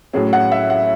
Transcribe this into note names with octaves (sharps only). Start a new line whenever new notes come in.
A2 F#3 C#4 G#4
F#5
E5
F#5